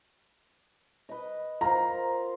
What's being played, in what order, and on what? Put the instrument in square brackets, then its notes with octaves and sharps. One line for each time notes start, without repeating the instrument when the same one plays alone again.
[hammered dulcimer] B4 D#5
[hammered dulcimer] F4 A#4 C5 [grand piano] A#5